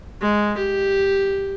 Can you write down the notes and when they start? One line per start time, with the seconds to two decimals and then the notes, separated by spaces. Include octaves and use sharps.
0.21 G#3
0.58 G4